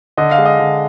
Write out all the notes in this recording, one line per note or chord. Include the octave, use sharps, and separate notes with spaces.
D3 D#5
F5
G#3
D#5
D3